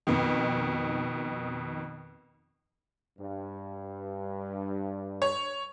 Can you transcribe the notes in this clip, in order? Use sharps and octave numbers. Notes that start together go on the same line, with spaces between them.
F2 B2 D#3
G2
C#5